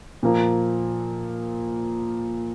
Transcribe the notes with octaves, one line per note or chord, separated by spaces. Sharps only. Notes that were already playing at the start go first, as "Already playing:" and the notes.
A#2 F3 A#3